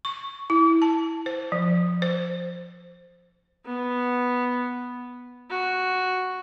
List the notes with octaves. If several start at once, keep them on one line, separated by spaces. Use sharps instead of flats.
C#6
E4
A5
C5
F3
C5
B3
F#4